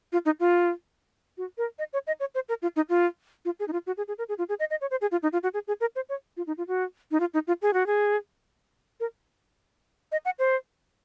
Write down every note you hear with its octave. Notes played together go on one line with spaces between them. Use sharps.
F4
D#4
F4
F#4
A#4
D#5
C#5
D#5
C#5
C5
A#4
F4
D#4
F4
F4
G#4
D#4
F4
F#4
G#4
G#4
A#4
G#4
F4
G#4
D#5
D#5
C#5
C5
G#4
F4
D#4
F4
F#4
G#4
G#4
A#4
C5
C#5
F4
D#4
F4
F#4
D#4
F4
D#4
F4
G#4
F#4
G#4
A#4
D#5
F#5
C5